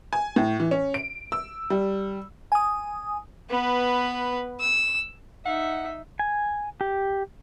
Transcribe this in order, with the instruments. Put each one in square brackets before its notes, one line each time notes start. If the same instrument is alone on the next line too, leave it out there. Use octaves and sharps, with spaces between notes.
[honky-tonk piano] G#5
A2
E3
C#4
D7
E6
G3
[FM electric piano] G#5 D#6
[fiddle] B3 B4
E6
[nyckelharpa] D#4 E5 [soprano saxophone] F#5
[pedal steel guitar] G#5
G4